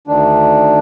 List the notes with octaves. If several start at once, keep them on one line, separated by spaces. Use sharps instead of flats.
D2 D#3 D4